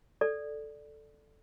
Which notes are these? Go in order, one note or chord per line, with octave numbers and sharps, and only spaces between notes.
A4 D5